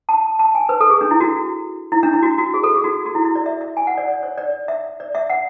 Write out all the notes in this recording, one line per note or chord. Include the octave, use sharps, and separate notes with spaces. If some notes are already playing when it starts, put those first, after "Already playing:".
A5
A5
G#5
B4
A4
G#4
D4
E4
F#4
E4
D4
E4
F#4
F#4
G#4
A4
G#4
F#4
F#4
E4
E4
D5
E5
E5
G#5
F#5
D5
D5
C#5
D5
E5
D5
E5
F#5